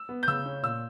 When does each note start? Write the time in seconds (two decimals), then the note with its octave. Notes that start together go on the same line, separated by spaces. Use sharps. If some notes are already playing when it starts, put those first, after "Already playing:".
Already playing: E6
0.09 B3
0.23 G6
0.28 C#3 E6
0.46 C#4
0.63 A#2 E6